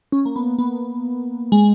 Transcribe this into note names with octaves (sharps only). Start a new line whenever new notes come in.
C#4
A#3
B3
B3
G#3